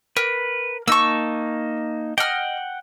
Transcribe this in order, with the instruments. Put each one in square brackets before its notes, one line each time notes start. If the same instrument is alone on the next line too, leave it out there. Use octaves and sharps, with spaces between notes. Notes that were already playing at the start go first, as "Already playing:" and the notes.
[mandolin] A#4 [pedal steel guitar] B4
[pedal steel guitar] A#3 D#4 A5 [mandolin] C#6 E6
[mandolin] D#5 F6 [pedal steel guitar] F#5 G5